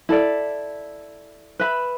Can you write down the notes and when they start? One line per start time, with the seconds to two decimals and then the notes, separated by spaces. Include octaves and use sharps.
0.09 E4 A4 D5
1.60 B4 E5 B5